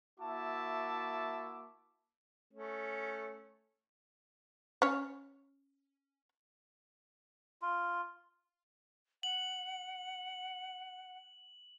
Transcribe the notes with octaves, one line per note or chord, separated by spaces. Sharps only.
A#3 E4 F#4 E5 A5 D6
A3 C#4
C#4 C#5
F4
F#5 F#7